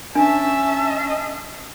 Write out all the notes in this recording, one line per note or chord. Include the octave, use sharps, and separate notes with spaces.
C#4 D4 E5 G#5 A5